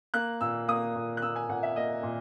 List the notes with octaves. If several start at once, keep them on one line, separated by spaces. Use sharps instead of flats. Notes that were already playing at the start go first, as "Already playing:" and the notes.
A#3 F#6
A#2 E6
A#3 D#6
A#2
F#6
A#3 E6
G#5
A#2 F#5
E5
A#3 D#5
A#2